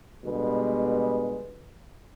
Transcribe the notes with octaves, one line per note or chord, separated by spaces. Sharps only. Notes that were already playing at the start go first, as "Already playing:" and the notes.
B2 D3 G3 G#3 B3